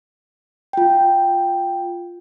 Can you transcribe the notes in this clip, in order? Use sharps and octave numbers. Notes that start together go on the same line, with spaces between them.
F4 G5